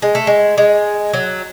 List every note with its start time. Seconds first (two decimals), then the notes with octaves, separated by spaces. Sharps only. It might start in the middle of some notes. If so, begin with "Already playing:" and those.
0.02 G#3
0.15 A3
0.27 G#3
0.58 G#3
1.14 F#3